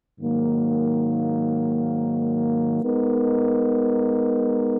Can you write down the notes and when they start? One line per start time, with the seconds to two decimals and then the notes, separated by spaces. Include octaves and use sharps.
0.19 G#2 D#3 F#3 A#3
2.82 G#3 B3 D#4 A#4